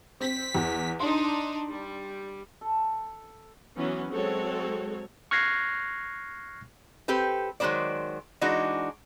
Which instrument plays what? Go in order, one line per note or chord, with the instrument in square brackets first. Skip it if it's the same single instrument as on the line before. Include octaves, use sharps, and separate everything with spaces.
[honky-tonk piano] C4 [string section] B6
[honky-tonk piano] E2
[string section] D4 D#4 [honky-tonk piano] C6
[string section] G3
[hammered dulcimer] A4
[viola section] E3 F#3 B3 C#4
F#3 G#3 C4 F#4 A4 C#5
[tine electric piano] C#6 F6 F#6 G#6 A#6 C7
[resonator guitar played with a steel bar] C4 G4 A4 B4
D#3 F#3 G#3 B3 C5 D5
E3 G#3 D4 D#4 F#4